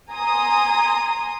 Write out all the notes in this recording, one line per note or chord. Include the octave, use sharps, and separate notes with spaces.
G#5 A#5 C6 D#6